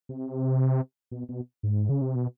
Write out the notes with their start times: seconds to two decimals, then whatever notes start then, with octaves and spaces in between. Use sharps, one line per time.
0.09 C3
1.11 B2
1.29 B2
1.63 G#2
1.89 C#3
2.01 C3
2.15 B2